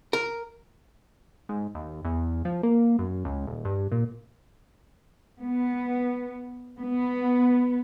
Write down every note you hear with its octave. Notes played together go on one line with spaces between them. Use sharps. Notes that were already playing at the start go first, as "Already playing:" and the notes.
A#4
G#2
D#2
E2
F3
A#3
F#2
C#2
D#1
G2
A#2
B3
B3